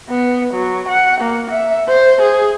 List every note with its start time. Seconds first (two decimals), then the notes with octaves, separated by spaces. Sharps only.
0.10 B3
0.54 F#3
0.89 F#5
1.21 A#3
1.51 E5
1.89 C5
2.22 G#4